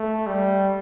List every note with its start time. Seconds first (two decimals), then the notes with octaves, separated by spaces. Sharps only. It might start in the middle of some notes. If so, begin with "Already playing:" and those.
Already playing: A3
0.27 G3